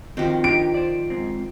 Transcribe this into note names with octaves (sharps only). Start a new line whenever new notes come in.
D#3 F3 C4 F#4 G4
D4 D#4 G4 D7
C5 D5
G#2 C4